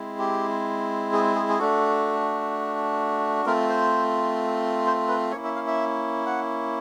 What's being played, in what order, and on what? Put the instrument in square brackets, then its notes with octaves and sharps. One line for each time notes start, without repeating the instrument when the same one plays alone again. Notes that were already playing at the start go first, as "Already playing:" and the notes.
Already playing: [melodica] G#3 C4 E4
G4
G#4
G#4
G#4
A3 D4 F#4 A4
A3 C4 F4 A#4
C5
C5
B4
A#3 C#4 E4 C#5
E5
F5
E5
F#5